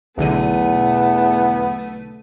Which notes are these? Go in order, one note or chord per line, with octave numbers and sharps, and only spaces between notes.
B1 E2 D3 A3 B3 D#7